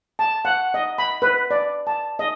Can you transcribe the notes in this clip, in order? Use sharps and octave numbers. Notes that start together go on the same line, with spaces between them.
A5
F#5
D#5
B5
B4
D5
A5
D#5